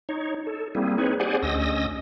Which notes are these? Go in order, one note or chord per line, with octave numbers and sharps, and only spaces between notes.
D#4 C#5
A4
G3 A#3 C4 E4 G#4
C4 D#4 G#4 B4 C#5
G4 G#4 C5 D5 F#5 G#5
D2 C#4 D#5 D#6 E6 A#6